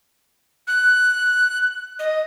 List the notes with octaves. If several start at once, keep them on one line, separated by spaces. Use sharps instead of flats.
F#6
D#5